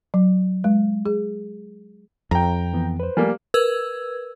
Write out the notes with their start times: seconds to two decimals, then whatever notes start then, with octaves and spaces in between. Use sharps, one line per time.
0.14 F#3
0.64 G#3
1.06 G#4
2.31 F2 G5 A#5
2.73 E3 B3
3.00 B4 C5
3.17 F3 G3 A3 A#3 G#5
3.54 A#4 B4 E6 G#6